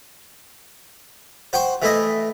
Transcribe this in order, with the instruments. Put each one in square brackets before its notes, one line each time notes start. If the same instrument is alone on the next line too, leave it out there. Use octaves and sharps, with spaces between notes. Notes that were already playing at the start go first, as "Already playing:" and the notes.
[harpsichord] C5 F#5 G5 C6 C#6
E3 A3 E4 D#5